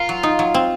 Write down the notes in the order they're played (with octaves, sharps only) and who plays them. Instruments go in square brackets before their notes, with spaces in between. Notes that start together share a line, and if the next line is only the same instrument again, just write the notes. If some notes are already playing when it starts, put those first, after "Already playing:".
Already playing: [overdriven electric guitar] F4 [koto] A#4
[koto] F#3
D#4
F#3
C4